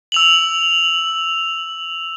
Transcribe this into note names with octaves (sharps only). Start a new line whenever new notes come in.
E6 F7 F#7